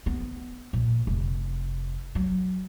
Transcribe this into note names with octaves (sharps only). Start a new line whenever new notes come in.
B3
A#1
F1
F#3